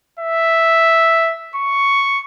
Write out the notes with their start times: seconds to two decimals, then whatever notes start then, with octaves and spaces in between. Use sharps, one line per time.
0.19 E5
1.56 C#6